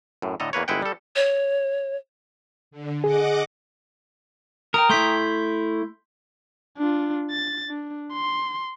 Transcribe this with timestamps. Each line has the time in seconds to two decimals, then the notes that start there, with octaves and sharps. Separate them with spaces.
0.22 F#2 A2
0.40 A2 D3 A4 D#5 A#5
0.53 E2 A#3 B4 C#5
0.68 G1 G#3 E4 B4 F#5 G5
0.82 G3 A4
1.16 C#5
2.71 D3
3.04 G#4 D#5 F#5 D6
4.74 A#4 G5 A#5 D#6
4.89 A3 E4 C6 G6 B6
6.78 D4 F4
7.31 A6
7.69 D4
8.14 C6